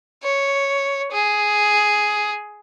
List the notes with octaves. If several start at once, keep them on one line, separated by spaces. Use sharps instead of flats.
C#5
G#4